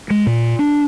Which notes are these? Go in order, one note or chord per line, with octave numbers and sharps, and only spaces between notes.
G#3
A#2
D4